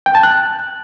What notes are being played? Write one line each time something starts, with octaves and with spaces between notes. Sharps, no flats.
G5
A5
F#6